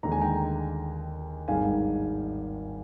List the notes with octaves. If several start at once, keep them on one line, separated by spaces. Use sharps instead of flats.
D#2 D3 G#3 A#5
G#5
G5 A#5
G#1 G2 D#3 G#3 F5 G#5